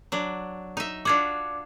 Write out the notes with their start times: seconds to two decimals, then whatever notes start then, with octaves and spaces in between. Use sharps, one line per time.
0.12 F#3 D4
0.77 D#4 E5
1.05 D4 F4 F#4 D6 G#6